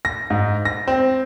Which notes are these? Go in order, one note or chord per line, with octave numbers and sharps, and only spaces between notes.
A#6
G#2
A#6
C4